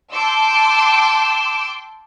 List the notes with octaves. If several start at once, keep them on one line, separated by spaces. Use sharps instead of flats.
G5 A5 C6 D6 E6